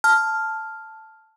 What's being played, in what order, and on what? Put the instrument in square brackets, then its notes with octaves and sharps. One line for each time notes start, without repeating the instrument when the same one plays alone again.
[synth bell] A5 F6